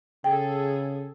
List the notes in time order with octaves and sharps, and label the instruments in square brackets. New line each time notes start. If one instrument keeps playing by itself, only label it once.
[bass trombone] C#3 [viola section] G#4 A4 [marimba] G5